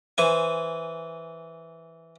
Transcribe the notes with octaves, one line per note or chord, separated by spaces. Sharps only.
E3 C5 G#5